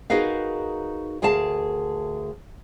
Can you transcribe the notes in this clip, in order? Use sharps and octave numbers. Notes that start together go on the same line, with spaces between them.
D#4 F#4 G#4 A#4 B4 F5
D2 G#4 A#4 F5 A5